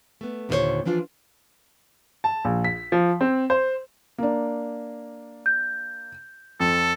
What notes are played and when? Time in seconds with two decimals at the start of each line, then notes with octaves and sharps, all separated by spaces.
0.21 A3 B3
0.49 D#2 A#2 D3 F4 C5 C#5
0.85 E3 F3 D4 F4
2.24 A5
2.45 A#1
2.64 B6
2.92 F3
3.21 C4
3.50 C5
4.18 A#3 D4
5.46 G6
6.60 F2 A4